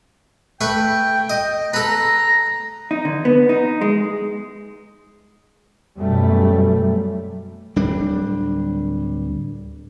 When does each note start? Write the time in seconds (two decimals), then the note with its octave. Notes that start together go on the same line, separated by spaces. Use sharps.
0.61 A3 B4 G5 C#6
1.30 D#5
1.74 A4 B4 A#5
2.91 D#4
3.05 D3
3.25 B3
3.49 D#4
3.81 G#3
5.99 F#2 B2 G3 A3
7.76 D1 G3 D4